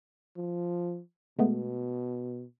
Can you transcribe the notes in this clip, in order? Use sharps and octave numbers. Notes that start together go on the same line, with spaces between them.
F3
B2 G#3 A3 B3